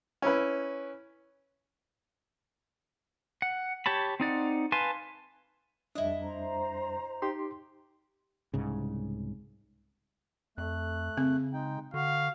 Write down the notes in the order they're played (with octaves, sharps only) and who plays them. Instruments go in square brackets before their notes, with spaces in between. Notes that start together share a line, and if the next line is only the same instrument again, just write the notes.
[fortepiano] C#4 E4 B4
[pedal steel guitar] F#5
G4 C#5 A5 B5
C4 D#4 D5 F#5
B4 F5 G#5 A5 C6
[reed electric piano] F2 G3 D4 [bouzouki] E4 D#5
[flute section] C5 A#5
[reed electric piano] D#4 G4 C6
[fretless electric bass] C2 G#2 C#3
[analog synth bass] F2 [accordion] A3 F#6
[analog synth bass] C#3 [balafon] C4
[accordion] G#3 D#4 G5
[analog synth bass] D3 [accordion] F#4 [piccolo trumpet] F5